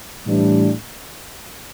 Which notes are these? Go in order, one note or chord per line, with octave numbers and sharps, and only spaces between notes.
A2 E3 G3 D4